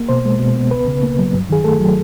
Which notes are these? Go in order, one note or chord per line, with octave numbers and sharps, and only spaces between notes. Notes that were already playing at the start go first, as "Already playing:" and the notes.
Already playing: A#3
B2 C5
G#3
B2
B3
C#2 B4
C#3
A#3
F#3
G2
D#3 G#4
A3 A4
F#3